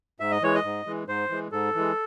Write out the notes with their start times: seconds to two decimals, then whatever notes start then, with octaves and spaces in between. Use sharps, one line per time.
0.20 G#2 E5
0.31 D#5
0.42 E3 G#3 C#5
0.55 D#5
0.64 G#2
0.86 E3 G#3
1.07 G#2 C5
1.30 E3 G#3
1.52 G#2 A4
1.75 E3 G#3